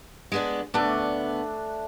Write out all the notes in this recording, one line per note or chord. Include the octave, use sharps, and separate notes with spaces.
G#3 B3 D4
D2 A3 B3 D4 D5